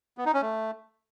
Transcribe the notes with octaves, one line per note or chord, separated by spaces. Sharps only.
B3
D#4
C#4
A3